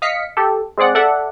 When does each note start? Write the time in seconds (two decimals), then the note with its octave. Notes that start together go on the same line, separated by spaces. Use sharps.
0.02 D#5 F5 B6 C#7
0.37 G4 A4
0.78 G#3 C4 G#4 D5 F#5
0.95 A4 D5 E5 F#5